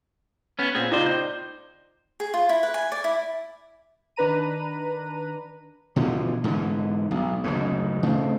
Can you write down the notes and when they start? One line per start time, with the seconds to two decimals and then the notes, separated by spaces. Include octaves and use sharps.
0.59 B3 C#4
0.75 A#2 C4 G#4
0.91 C#2 D#4 F4 C5 D5
1.06 G6
2.20 G#4
2.34 F4
2.49 E4
2.63 B4
2.74 G#5
2.92 D5
3.04 E4
4.16 D#3 D4 B4 A#5 D#7
5.96 B2 D3 E3 F3
6.44 G#2 D3 E3
7.11 B1
7.44 F#1 D2 G#2
8.03 C#3 A3 C4